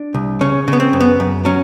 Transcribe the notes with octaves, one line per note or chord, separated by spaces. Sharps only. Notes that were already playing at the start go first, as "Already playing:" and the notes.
Already playing: D4
C2
C#3 C#4
C#3
B3
C4
F#2
B3
F#2
F#3 C#4